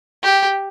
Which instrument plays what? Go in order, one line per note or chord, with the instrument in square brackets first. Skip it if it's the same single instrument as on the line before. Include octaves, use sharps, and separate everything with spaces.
[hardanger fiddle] G4